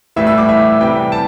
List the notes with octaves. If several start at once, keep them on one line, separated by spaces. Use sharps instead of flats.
A2 E3 G3 E5
E6
D6
E5
C3 E3 G3 G5
G5
A5